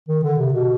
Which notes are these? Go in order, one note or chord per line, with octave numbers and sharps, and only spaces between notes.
D#3
D3
C3
B2